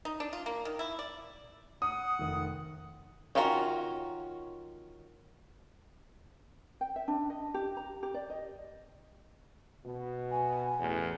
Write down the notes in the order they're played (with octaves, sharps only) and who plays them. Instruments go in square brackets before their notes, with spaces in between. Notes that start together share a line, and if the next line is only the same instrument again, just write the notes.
[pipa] D#4
D4
F4
A#3
D#3
E4
D5
[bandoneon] F#5 [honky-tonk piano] D#6
[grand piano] F1 D#3
[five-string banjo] D#3 C#4 F4 F#4 A#5
[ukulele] G5
E5
D4
D#5
G4
A#5
G4
D5
D#5
[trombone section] B2
[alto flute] G#5
[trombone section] A1 E2